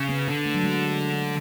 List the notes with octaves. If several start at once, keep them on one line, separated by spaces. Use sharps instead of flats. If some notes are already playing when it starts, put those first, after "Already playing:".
Already playing: C#3
B3
D3 B3
A3
F#3
G#3